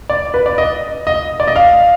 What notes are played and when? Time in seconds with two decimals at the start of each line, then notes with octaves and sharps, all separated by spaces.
0.09 D5
0.34 B4
0.46 D5
0.58 D#5
1.07 D#5
1.40 D5
1.48 D#5
1.56 F5